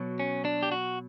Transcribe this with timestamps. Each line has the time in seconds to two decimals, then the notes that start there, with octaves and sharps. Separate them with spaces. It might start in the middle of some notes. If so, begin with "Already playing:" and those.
Already playing: B2 F#3
0.19 C#4
0.45 D4
0.63 G4
0.72 F#4